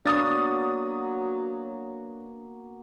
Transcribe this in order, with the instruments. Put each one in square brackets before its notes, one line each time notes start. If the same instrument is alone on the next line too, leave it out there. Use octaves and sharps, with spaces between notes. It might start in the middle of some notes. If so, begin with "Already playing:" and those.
[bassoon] F#3 [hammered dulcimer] A#3 B3 F#4 [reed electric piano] D4 [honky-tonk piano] D#6 A6